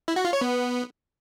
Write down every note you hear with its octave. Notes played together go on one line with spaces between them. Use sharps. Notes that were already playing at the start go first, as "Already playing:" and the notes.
E4
F#4
F4
C#5
B3